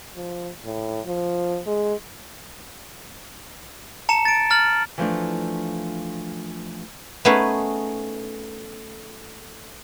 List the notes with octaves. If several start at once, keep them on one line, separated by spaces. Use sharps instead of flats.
F3
A2
F3
G#3
A5 A#5 C#7 E7
A6 D7
A#5 F6 A6 F#7
E3 F3 A3 D4
A3 B3 C#4 D#4 G#4 B4